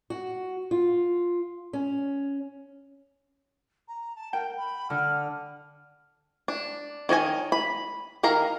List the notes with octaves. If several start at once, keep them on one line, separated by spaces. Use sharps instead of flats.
F#4
F4
C#4
A#5
A5
A#4 G5
B5
D3 F6
D4
D#3 C#5 D#5 G#5
B5
D#3 A#4 F5 A#5